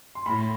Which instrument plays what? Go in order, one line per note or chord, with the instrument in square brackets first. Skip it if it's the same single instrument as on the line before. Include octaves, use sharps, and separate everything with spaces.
[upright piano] C6
[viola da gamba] A2 [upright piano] B5